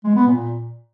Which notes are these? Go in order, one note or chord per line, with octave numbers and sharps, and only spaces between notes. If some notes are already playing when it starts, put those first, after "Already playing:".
G#3
B3
A#2